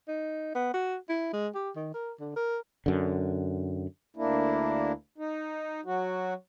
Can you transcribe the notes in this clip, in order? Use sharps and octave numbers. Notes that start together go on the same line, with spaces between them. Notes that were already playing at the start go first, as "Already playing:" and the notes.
D#4
B3
F#4
E4
G#3
G4
D#3
A#4
D3
A#4
F#2 D3
D2 A#3 D4 E4
D#4
F#3 F#4